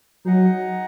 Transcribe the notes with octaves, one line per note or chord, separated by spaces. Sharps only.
F#3 D#4 G#4 D#5 F#5